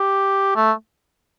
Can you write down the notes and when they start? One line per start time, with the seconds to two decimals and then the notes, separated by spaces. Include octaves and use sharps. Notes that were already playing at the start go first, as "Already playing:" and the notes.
Already playing: G4
0.55 A3